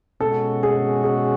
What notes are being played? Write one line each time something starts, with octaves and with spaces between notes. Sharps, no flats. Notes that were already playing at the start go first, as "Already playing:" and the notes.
B2 G#3 C#4 F#4 A4
G#4
G#4